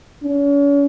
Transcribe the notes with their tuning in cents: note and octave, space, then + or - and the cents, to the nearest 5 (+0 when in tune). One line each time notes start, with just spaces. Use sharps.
C#4 +40